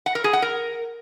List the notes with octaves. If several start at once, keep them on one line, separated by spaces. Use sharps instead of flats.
F#5
A#4
G#4
F#5
A#4